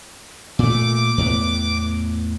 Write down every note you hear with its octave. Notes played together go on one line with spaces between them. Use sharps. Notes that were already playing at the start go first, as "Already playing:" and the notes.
A#2 A3 D6
E2 A2 B3